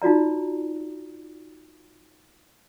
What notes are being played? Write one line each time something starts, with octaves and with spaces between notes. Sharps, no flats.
D#4 F4 F#4 D5 A#5